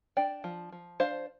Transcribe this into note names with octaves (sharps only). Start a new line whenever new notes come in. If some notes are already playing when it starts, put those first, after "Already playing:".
D4 D5 G5
F3
F3
D4 C5 F5